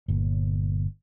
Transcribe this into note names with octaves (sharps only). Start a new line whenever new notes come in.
G1 A#2